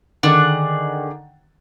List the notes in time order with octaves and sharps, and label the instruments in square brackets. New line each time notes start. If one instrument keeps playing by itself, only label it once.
[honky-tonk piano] D3 D#3 A6 [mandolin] D4 G#4 F#5